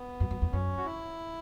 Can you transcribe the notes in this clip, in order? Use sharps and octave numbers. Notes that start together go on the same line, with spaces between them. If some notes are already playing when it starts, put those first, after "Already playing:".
Already playing: B3
F#2
F#2
E2
F#2 C#4
F#4
E4